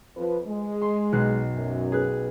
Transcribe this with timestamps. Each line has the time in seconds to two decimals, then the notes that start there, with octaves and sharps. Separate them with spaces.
0.17 F2 F3 B4
0.48 G#3
0.82 C6
1.12 B1 F#6 C7
1.55 F#2
1.92 G#4 B4 F#6